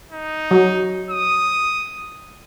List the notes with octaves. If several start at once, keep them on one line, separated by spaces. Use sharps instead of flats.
D#4
F#3
D#6